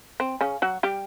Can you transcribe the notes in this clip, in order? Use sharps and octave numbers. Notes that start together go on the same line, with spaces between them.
C4
C#3 C#4
F#3 F#4
G3 G4